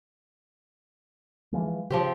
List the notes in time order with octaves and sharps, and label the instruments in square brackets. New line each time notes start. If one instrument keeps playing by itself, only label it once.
[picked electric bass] E3 F3 G#3
[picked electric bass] C#3 [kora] F3 C4 G4